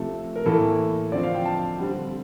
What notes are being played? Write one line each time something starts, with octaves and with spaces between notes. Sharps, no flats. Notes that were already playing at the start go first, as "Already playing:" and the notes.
Already playing: C3 F3 A3 A4
A#4
A2 E3 A#3 A4
D3 F3 C4 D5
F5
G5
A5
D3 G3 C4